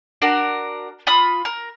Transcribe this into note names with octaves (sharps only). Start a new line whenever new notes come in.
D4 F#4 A#4
F4 B5 D#6
A#4